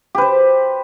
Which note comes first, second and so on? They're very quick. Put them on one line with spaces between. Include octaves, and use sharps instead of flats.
G4 B4 C5